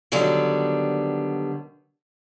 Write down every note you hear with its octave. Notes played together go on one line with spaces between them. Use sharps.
D3 D#3 F#3 G3 B3